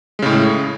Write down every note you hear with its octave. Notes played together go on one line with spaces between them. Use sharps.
A2 C#3 G#3